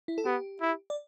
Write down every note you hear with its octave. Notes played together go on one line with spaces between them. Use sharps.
E4
A4
B3 G4
E4
D5